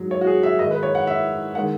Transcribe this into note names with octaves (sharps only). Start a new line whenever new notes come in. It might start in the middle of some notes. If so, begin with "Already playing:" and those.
Already playing: G#2 F#3
C#5
F#4
G#4
E5
G#2 D#3 G#3 D#5
B4
C#5
F#5
E5
D#3 G#3 F#5